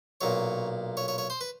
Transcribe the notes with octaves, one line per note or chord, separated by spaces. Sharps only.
B1 A#2 C#5
C#5
C#5
C#5
C5
B4